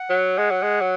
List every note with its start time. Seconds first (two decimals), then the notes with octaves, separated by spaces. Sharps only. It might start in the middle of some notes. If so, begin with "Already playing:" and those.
Already playing: F#5
0.10 F#3
0.38 G#3
0.51 F#3
0.63 G#3
0.81 F#3